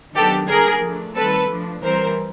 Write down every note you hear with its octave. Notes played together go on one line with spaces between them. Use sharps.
D#3 F#3 B3 D4 G4 A4
D3 G3 A#3 D4 G#4 A#4
F3 A3 D4
D#3 G3 C4 A4 B4
F3 A3 D4
E3 G3 C4 A#4 C5